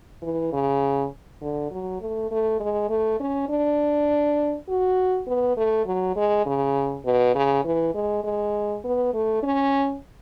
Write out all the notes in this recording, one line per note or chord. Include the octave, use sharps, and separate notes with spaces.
E3
C#3
D3
F#3
A3
A3
G#3
A3
C#4
D4
F#4
B3
A3
F#3
G#3
C#3
B2
C#3
E3
G#3
G#3
B3
A3
C#4